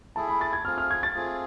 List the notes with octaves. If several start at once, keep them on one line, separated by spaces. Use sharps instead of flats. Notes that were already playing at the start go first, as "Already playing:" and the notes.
A3 E4 G#4 A5
B5
A6
G#6
A3 C4 F4 G#4 F6
F6
G#6
A6
A3 C4 F4 G#4